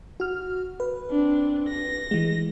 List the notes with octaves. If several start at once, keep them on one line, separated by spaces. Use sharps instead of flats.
F#4 F6
B4
C4 D4
A#6
E3 G#3